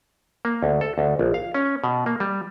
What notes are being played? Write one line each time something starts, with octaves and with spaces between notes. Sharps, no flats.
A#3
D2
A4
D2
A#1
F5
C#4
B2
A#3
G3